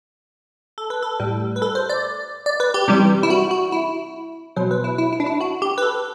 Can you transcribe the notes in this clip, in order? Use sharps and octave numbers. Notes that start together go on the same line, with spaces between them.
A4
B4
A4
A2 G3
B4
A4
C5
D5
D5
B4
G4
C3 E3 G3
E4
F#4
F#4
E4
B2 F#3 C5
B4
E4
E4
E4
D4
E4
F#4
G4
B4
A4